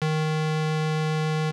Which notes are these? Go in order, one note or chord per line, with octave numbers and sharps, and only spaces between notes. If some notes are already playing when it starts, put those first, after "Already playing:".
D#3